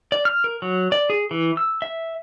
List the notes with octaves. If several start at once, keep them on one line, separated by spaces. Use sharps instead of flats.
D5
F6
A#4
F#3
D5
G#4
E3
E6
E5